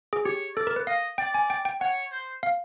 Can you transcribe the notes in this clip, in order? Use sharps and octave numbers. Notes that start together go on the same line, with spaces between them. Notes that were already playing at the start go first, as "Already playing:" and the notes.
G#4
G4 C#5
A4 D5
A#4
B4
D#5 F5
D5 G5
G#5
G5
G5
C#5 F#5
C5
F5